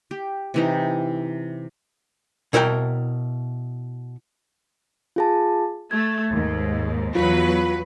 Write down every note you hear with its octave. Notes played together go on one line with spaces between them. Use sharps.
G4
C3 E3 D#4
B2 E4 A#4 C#5 G5
F4 G#4 A5
A3 G#6
D#2 G#2
E2 F#3 F4 B4